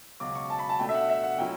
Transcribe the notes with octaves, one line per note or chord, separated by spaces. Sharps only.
C#2 B2 F#3 D6
C#6
A5
B5
A5
B2 A3 D4 G5
E5
F#5
E5
F#5
B2 F#3 C#4 E4 G5